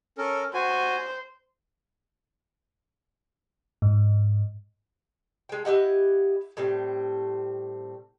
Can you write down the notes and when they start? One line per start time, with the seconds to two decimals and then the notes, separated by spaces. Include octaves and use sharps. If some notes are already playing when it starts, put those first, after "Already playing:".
0.18 C#4 A4 A#4
0.54 F#4 C5 G#5
3.82 G#2
5.49 G#3 G5
5.65 E4 G4 D#5 F#5
6.57 A2 G3 C4